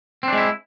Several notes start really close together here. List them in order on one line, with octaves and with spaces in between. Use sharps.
C4 D4 G#3 E4